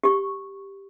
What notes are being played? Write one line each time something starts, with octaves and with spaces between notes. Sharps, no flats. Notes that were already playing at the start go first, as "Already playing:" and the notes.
G4 C#6